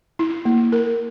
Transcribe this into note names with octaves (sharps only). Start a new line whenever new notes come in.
E4
A#3
A#4